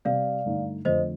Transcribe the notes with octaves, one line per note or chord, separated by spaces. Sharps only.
C3 G3 C4 D5 F5
G2 D3 A3 D#4
F2 D3 A3 C5 D#5